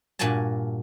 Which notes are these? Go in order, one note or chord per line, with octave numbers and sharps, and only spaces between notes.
G2 A#2 F#4 A#4 G#5 A5